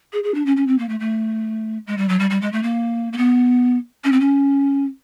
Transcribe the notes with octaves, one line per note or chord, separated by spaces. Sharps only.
G#4
G#4
D4
C#4
C#4
C4
A#3
A3
A3
G#3
G3
F#3
G3
G3
G#3
A3
A#3
A#3
B3
C#4
C4
C#4